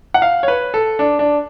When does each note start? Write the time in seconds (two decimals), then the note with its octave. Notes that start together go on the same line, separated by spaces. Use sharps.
0.14 F#5
0.22 F5
0.43 C#5
0.48 B4
0.74 A4
0.99 D4
1.19 D4